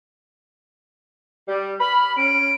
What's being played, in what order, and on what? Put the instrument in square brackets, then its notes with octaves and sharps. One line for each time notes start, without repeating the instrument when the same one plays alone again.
[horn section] G3
[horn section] B5 [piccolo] F6
[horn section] C#4 [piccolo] D7